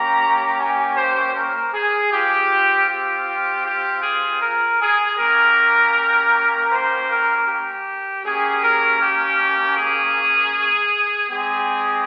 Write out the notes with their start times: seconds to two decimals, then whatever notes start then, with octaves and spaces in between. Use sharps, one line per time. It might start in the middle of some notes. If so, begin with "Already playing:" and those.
Already playing: A#3 C#4 G4 A#5
0.58 G#5
0.97 C5
1.36 A#4
1.73 G#4
2.11 C4 F4 G4
2.88 G4
3.65 G4
4.03 G#4
4.41 A#4
4.80 G#4
5.17 A#3 C#4 G4 A#4
6.71 C5
7.10 A#4
7.47 G4
8.24 A#3 C#4 G4 G#4
8.63 A#4
9.01 G4
9.77 G#4
11.29 G#3 C4 G4 G#4